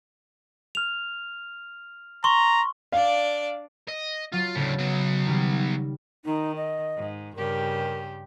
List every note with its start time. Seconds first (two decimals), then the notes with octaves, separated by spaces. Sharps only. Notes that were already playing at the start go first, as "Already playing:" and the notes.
0.75 F6 F7
2.24 A#5 C6 C#6
2.92 D4 D5 F5
3.88 D#5
4.33 F#3 F4 A6
4.56 D2 A2 C#3
4.79 F#3 B3
5.26 D#3 G3
6.25 D#3 D#4
6.56 D#5
6.96 G#2
7.36 G2 C#3 G4 A#4